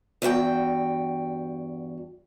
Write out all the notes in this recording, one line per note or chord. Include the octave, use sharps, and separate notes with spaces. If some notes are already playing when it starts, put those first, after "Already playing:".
E2 G2 F#4 G5